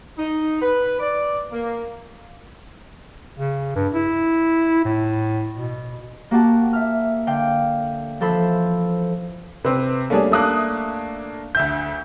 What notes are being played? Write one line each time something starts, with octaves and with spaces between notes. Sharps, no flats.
D#4
B4
D5
A#3
C#3
G2
E4
A2
B2
A#3 F#4 G4 F#5 A5
E5 F6
D3 F5 G5 G6
E3 F3 A4 C5 B5 E6
C3 C4 B4
G3 A3 A#3 C#4 D4 G#4
A3 A#3 D4 E5 D#6 F#6
D2 E5 G6